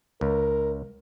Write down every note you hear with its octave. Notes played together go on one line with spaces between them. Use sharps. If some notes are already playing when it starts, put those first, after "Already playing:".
C#2 A#4